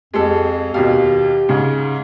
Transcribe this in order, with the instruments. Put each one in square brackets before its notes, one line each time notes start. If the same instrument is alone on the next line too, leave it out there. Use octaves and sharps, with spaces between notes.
[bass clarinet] F2 [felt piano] G#3 G4 A4
[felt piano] D#2 B2 F5 [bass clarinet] G4
[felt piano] G#2 C#3